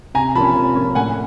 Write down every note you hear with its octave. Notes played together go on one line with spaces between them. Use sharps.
C3 G#5 A#5
F3 A#3 C#4 A5 B5
C3
F3 A#3 C#4
A2 F#5 G#5